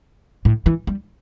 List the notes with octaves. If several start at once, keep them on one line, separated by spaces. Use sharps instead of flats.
A2
E3
G3